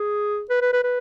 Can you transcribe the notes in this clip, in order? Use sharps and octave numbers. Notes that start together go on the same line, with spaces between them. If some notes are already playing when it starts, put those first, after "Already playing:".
Already playing: G#4
B4
B4
B4
B4